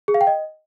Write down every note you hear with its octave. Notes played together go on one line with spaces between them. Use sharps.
G#4
F5
G5
D#5